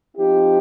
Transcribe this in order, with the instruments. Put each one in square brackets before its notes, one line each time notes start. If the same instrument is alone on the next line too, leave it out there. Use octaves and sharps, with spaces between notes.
[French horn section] F3 C4 D#4 G4